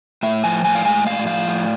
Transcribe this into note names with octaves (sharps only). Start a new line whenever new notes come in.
A2 E5
F3 G#5
A2 G#5
F5
G#3 G#5
A2 F5
F3 F5
A2